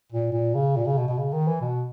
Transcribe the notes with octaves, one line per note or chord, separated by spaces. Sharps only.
A#2
A#2
C#3
A#2
C#3
B2
B2
C#3
D#3
E3
B2